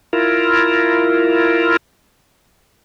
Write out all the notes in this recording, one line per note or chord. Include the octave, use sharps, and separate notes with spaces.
E4 F4 A#4